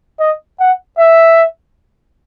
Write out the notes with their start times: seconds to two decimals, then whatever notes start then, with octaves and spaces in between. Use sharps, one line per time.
0.20 D#5
0.60 F#5
0.99 E5